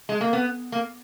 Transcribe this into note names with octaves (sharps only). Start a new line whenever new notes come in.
G#3
A#3
B3
A#3